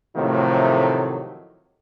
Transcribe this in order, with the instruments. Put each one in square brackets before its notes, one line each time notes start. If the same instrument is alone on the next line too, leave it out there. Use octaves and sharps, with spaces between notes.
[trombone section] A2 C3 D#3 F3 F#3 A3